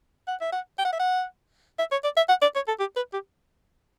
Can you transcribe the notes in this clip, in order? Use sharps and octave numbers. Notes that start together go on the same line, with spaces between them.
F#5
E5
F#5
G5
F#5
E5
F#5
E5
C#5
D5
E5
F#5
D5
C#5
A4
G4
B4
G4